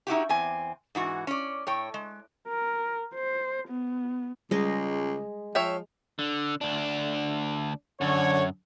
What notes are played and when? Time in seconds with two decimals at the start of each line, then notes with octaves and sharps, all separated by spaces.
0.07 D#4 E4 F#4 G4
0.29 E2 C4 G#5
0.95 G#2 E3 F#4
1.27 C#4 D5
1.67 A2 C#5 G5
1.94 G#3
2.48 A#4
3.15 C5
3.68 B3
4.51 C#2 G3 G#3 D#5
5.55 F3 C#5 E5 G5
6.19 D3
6.61 D2 D4
8.01 F#2 D3 C#5